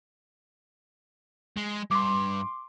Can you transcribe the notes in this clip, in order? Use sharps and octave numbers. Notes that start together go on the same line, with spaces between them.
G#3
G2 C6 D6